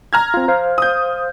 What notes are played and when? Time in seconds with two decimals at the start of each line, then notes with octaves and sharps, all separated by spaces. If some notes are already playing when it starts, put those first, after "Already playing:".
0.13 A#5 F6 G#6
0.34 C4 F4
0.48 C5 F5
0.78 D#6 G6